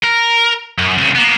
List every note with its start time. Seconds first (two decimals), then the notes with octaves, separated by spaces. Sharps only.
0.04 A#4
0.78 F#2
0.98 C2 C#3
1.15 A#3 B3